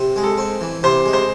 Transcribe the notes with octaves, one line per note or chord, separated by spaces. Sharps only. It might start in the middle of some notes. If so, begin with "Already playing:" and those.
Already playing: C3
G#3
A4
C4
E3
C3 C5
G#3
C5